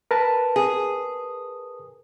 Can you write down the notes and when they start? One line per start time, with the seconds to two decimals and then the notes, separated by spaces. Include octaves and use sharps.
0.11 A#4 B4 A5
0.56 G#4